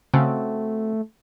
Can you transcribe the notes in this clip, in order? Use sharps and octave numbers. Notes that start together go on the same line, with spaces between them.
C#3 A3 C4 F#4 A4